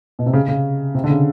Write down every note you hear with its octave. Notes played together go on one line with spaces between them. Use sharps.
B2
C3
C#3
C#3
C3
D3
C#3